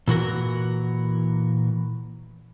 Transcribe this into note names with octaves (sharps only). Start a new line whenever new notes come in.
A#2 E3 F#4 A#4